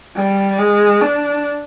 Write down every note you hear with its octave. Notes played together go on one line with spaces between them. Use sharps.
G3
G#3
D4